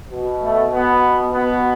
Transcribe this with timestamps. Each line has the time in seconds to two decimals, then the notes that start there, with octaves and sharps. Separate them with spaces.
0.11 B2
0.42 A3
0.72 B3
1.33 B2 B3